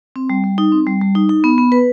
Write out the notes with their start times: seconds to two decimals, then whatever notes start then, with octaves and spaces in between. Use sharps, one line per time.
0.16 C4
0.30 G3
0.44 G3
0.58 D#4
0.72 C4
0.87 G3
1.01 G3
1.15 D#4
1.29 D#4
1.44 B3
1.58 B3
1.72 B4